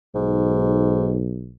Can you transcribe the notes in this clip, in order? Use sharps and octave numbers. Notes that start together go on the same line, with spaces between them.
B1 G#2